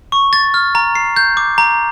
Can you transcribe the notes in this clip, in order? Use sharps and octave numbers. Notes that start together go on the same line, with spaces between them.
C#6
A6
F6
A#5
C7
G6
D6
A#5